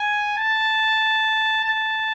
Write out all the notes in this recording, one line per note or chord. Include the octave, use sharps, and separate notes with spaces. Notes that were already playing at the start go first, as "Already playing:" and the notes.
Already playing: G#5
A5
A5